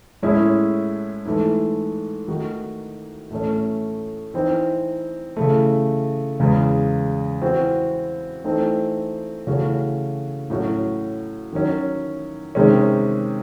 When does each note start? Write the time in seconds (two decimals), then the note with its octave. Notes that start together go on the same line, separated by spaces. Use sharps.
0.22 A2 G#3 C#4 E4 G#4
1.25 G#2 E3 A3
2.28 D#3 A3 D#4 F#4
3.31 A2 E3 A3 C#4
4.34 E3 C4 D#4
5.37 C#3 E3 A3
6.40 E2 C#3 G#3
7.42 E3 C4 F#4
8.44 E3 A3 C4 D#4
9.47 C#3 E3 A3 C#4 F#4
10.50 A2 F#3 C#4 F#4
11.53 D#3 F#3 C#4
12.55 C3 D#3 G#3 C#4 G#4